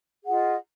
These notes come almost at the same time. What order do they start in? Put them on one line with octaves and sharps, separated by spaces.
G#4 F#5 F4 D#5